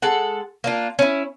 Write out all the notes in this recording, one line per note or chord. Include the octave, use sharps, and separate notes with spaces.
G#3 A4 F#5
A#3 D4 F4
C#4 E4